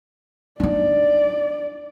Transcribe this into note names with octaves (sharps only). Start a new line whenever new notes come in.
D4 D#4 D5